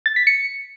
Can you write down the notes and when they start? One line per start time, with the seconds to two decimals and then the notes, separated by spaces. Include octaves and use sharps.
0.06 A6
0.16 B6
0.27 C#7